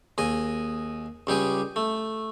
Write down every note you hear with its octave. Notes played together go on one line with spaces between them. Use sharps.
D#2 G#4 D#5
C#2 G3 G4 G#4
A3